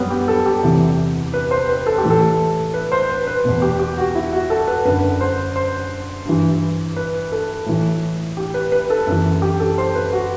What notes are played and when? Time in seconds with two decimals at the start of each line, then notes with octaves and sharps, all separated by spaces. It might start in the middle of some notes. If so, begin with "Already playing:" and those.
Already playing: F#2 F#3 G3 B3
0.10 G4
0.28 A4
0.46 G4
0.63 E2 C3 E3
1.34 B4
1.51 C5
1.69 B4
1.86 A4
1.98 G4
2.04 A2 E3
2.10 A4
2.74 B4
2.92 C5
3.10 B4
3.27 B4
3.45 E2 B2
3.62 G4
3.79 G4
3.98 F#4
4.15 E4
4.33 F#4
4.50 A4
4.67 B4
4.85 F#2 D3 B4
5.21 C5
5.56 C5
6.25 G2 E3
6.96 B4
7.32 A4
7.66 A2 E3
8.37 G4
8.54 B4
8.72 B4
8.90 A4
9.07 F#2 E3
9.42 G4
9.60 A4
9.78 C5
9.95 B4
10.13 F#4